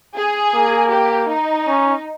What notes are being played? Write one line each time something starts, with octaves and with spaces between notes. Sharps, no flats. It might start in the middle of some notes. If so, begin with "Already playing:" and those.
G#4
A#3
G4
D#4
C#4